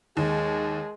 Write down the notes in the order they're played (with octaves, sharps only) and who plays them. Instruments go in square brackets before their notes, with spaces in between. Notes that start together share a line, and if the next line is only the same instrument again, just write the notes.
[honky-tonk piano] D#2 [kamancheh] G#3